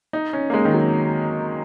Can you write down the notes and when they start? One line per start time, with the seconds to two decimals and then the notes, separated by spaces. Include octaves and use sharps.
0.13 D#4
0.33 C#4
0.50 A#3
0.54 G#3
0.65 D#3
0.74 F#3